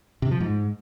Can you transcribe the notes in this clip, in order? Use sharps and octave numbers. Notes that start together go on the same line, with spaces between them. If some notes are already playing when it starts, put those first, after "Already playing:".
C3
F3
G#2